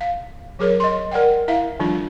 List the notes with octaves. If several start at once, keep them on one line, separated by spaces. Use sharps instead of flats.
F5
F#3 G#4 A#4 C#5
D#5 C6
A#4 D5 F#5 G5
E4 E5 F5
D#3 F3 G3 D4 F4